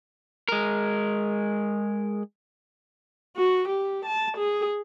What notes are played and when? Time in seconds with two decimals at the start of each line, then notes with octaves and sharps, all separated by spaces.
0.48 G#3 A#4
3.37 F#4
3.69 G4
4.06 A5
4.38 G#4